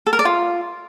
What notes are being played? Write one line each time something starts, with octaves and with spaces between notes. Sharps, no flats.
A4
A#4
D5
F4